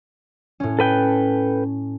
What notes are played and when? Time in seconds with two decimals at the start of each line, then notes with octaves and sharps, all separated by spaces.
0.60 A2 C#4
0.79 A4 B4 G5